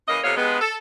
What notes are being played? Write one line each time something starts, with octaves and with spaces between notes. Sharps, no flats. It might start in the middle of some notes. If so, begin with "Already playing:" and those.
C#3 E3 A#3 D#5
F2 C3 A3 B3 C#5 F5
G2 G#3 B3
A4